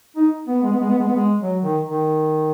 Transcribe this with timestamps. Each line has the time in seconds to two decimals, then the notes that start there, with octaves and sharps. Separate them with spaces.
0.16 D#4
0.47 B3
0.63 G#3
0.72 B3
0.81 G#3
0.89 B3
0.98 G#3
1.07 B3
1.16 G#3
1.41 F#3
1.63 D#3
1.83 D#3